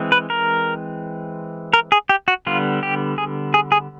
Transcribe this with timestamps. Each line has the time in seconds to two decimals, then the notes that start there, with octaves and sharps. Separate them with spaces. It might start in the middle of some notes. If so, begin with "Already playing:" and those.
Already playing: E3 G#3 C4
0.12 B4
0.30 A#4
1.73 A#4
1.92 G#4
2.09 G4
2.28 F#4
2.47 D3 G3 B3 F4
2.83 G4
3.18 G#4
3.54 G#4
3.72 G#4